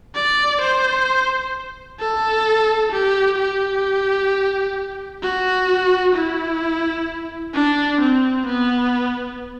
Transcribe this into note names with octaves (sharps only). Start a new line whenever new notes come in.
D5
C5
A4
G4
G4
F#4
E4
D4
C4
B3